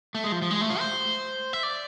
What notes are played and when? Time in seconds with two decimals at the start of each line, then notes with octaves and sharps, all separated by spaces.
0.15 A3
0.24 G#3
0.32 F3
0.42 F3
0.51 G#3
0.61 A3
0.70 F4
0.80 C5
1.53 E5
1.63 D5